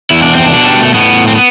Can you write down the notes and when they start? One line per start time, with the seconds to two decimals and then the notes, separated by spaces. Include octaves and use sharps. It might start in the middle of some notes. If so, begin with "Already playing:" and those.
0.10 E2 E4
0.22 D4
0.33 C4
0.45 D4
0.52 B2
0.66 G3
0.80 A3
0.94 A2 B3
1.28 C4
1.35 B3